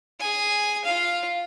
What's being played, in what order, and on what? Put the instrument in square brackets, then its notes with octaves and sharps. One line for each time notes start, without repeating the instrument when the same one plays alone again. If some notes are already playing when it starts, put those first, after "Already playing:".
[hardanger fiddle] G#4 G#5
F4 F5